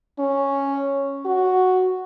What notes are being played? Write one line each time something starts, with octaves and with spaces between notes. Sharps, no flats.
C#4
F#4